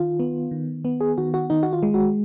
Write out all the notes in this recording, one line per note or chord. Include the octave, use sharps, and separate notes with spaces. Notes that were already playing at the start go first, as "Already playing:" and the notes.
Already playing: D#3 F4
B3
D#3
B3
G#4
D#3 F#4
F#4
D#3 D#4
F#4
F4
G#3
F#4